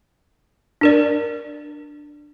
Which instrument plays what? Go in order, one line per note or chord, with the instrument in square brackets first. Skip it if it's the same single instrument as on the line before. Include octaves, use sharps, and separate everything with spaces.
[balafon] D4 A#4 D5